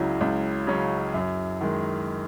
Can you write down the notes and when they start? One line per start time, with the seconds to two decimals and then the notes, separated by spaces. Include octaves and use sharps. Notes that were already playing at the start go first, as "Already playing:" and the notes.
Already playing: C#2 C#3 F#3 C#4 E4
0.21 C#2
0.67 C#3 F#3 C#4
1.14 F#2
1.61 D#3 G#3